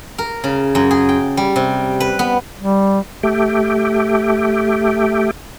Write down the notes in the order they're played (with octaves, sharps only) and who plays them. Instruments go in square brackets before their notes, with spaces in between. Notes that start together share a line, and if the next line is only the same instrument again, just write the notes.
[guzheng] A#4
C#3
F#2
G#4
G5
G3
C3
B4
B3
[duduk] G3
[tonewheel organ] A3 G4